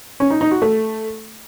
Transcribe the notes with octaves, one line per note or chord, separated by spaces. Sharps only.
C#4
D#4
D#4
F#4
A3